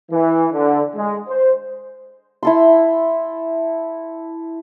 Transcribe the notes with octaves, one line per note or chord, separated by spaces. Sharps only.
E3
D3
G#3
C5
E4 A4 C6